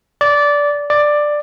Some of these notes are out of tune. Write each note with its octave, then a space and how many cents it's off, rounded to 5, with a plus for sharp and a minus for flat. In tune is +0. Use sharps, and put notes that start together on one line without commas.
D5 -15
D5 +10